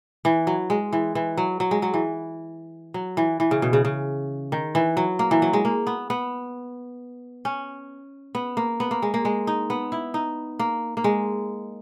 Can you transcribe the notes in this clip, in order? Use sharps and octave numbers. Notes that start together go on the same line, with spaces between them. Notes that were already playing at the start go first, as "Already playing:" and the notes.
E3
F#3
G#3
E3
E3
F#3
F#3
G#3
F#3
E3
F#3
E3
E3
C#3
B2
C#3
C#3
D#3
E3
F#3
A#3
E3
F#3
G#3
A#3
B3
B3
C#4
B3
A#3
B3
A#3
G#3
A#3
G#3
D#4
B3
E4
D#4
A#3
A#3
G#3